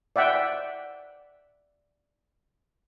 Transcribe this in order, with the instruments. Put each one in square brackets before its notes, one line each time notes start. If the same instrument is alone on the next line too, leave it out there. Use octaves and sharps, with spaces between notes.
[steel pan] D5 E5 F#5 G5